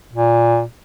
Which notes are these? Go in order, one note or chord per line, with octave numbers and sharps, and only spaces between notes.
A#2